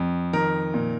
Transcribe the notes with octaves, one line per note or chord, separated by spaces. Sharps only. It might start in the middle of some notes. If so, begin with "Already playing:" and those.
Already playing: F2
D#3 A#4
A#2